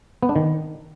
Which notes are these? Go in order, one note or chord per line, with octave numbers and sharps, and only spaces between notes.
B3
D4
D#3